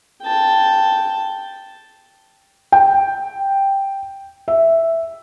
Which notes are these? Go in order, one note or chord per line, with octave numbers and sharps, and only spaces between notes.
G5 A5
G5
E5